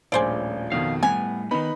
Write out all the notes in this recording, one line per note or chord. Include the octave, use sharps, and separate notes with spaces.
D#1 A#1 A2 G#4 C5 D5
F2 B2 D#3 F5
A2 G3 B3 G#5
D#3 B3 D#4 B4 B5